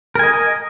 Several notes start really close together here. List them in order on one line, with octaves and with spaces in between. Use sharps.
A#4 G#5 D#5